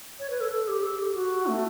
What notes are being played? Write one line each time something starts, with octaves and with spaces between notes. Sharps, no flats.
C#5
B4
A4
A4
G4
A4
G4
F#4
A3